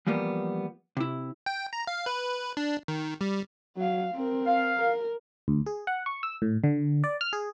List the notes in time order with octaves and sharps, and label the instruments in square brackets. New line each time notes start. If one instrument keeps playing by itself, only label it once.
[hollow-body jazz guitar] E3 F3 G3 A#3 B3
C3 E4
[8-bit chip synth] G5
A#5
F5
B4
D4
D#3
G3
[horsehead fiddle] F#3 F5
C4 A#4
[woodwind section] F5
[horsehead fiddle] A#4
[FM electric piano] D2
G#4
F#5
C#6
E6
A2
D3
D5
F6
G#4